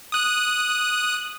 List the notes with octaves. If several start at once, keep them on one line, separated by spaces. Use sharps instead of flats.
D#6 F#6